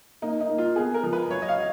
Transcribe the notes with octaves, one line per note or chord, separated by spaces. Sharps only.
A#3 D#4
D#4
A#3
F4
B3 G#4
A#4
F3
B4
F#3 C#5
D#5
F5
F#3